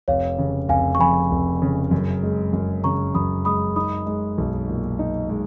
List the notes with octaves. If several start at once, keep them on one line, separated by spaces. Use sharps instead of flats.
F1 C#5 F5
C#3
F1 F5 G#5
C#6
F2 G#5 B5
F1
C#3
F#2
G#3
F#2
C#3 A#5 C#6
F#2 B5 D#6
G#3 B5 D#6
D#4 B5 D#6
G#3
B1
A#2
D#4
G#3